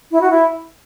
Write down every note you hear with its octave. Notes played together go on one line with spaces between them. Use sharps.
E4
F#4
E4